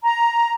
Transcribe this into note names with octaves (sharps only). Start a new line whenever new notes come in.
A#5